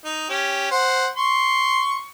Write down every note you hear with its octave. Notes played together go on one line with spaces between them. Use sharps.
D#4
C#4 G4
C5 F#5
C6 C#6